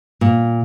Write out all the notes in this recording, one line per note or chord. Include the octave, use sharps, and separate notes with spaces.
A#2